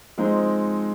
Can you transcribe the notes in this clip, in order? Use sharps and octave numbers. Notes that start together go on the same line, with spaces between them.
F3 G#3 C4 D#4